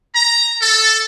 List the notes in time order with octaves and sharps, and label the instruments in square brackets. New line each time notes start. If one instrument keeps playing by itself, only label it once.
[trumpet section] A#5
A4